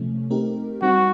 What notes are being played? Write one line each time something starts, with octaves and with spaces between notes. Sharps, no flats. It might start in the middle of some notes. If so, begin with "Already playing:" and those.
Already playing: C3 F3 A3 C#4
A3 C4 D#4 G4 A#4
G3 C4 D#4 F#4